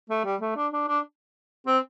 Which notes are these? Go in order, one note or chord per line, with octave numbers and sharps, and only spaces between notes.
A3
G3
A3
D4
D4
D4
C4